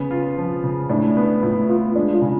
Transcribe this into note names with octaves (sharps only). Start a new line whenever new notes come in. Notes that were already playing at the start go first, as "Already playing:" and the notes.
Already playing: C#3 B3 C#4
F4
F3
C#3
A2 D4
B3
A2 F4
B3 F4
G#3 D4
F4
C#3